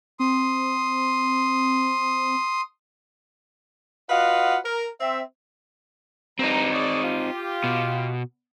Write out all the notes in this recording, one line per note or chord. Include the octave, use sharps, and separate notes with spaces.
C4 C6 D#6
F4 F#4 B4 D#5 F5 F#5
A#4
C4 E5
G2 C4 D#4 A#5
G#4 C#5 D5
F4 G4
B2